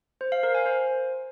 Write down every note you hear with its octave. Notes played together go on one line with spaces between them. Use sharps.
C5
F5
A#4
G#5
C5